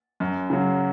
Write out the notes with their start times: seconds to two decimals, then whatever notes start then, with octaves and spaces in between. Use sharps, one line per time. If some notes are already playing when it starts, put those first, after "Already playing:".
0.20 F#2
0.50 C#3 F#3